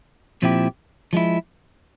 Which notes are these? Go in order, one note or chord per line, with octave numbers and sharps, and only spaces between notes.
A#2 F3 C4 E4 G4
F3 G#3 E4